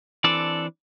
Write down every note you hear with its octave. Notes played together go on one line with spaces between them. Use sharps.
E3 C4 D4 A4 D5